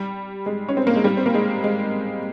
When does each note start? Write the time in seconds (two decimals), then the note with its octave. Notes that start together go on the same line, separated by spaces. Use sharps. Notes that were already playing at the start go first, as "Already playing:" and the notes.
Already playing: G3
0.46 G#3
0.69 C#4
0.77 C4
0.87 A#3
0.96 G#3
1.04 G3
1.17 C4
1.26 A#3
1.34 G#3
1.64 G#3